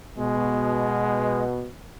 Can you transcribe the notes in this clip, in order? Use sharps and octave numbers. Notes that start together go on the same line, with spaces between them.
B2 G#3